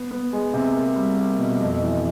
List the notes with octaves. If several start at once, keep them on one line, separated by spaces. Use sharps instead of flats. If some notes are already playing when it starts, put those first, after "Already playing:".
Already playing: B3
B3
G#3
C3
A#3
G3
A#3
B2
F2
E3